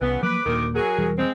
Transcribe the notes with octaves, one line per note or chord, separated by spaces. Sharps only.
C2 C#3 E3 B3 B4
F3 F#3 A#3 B4 D6
D#1 D2 A#2 D#3 A#3 A#4
F#3 G#4 A#4
E1 E3 G3
G#3 C4